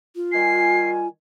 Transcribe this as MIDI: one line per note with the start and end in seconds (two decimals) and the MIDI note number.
0.16 1.08 65
0.32 1.05 51
0.32 1.05 55
0.32 1.05 80
0.32 0.90 96